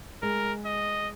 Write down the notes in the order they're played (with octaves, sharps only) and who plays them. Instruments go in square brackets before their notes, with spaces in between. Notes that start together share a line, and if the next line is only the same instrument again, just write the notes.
[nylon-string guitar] G#3 [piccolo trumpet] A#4
[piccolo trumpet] D#5